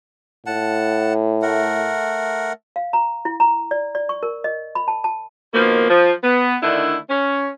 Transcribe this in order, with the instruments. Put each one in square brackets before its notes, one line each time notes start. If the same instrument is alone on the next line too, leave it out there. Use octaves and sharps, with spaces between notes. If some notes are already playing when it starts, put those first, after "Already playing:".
[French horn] A2 [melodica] F#5 A5
[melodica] A3 A#4 F#5
[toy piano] F5
A#5
E4
A#5
D5
D5
C#6
A#4
D#5
B5
A5
A5
[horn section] B2 D#3 F3 A#3
F3
B3
D3 D#3 A3 D4 E4
C#4